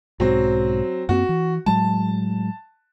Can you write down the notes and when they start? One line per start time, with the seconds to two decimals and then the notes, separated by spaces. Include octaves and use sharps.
0.20 B1 G#2 F#3 C4
1.09 F#2 A#3 C4 F#4
1.29 E3
1.66 A2 F#3 G#3 A5